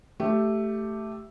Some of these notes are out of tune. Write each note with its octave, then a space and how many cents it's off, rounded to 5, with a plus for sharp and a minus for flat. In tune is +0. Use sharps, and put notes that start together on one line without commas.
A3 +0 G4 -5